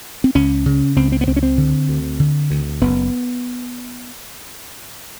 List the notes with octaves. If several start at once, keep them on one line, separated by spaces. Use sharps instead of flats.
C4
C#2 C#4
C#3
C#2 C4
C4
B3
C#2 C4
C#4
C4
D3
D2
D3
D2
F#1 B3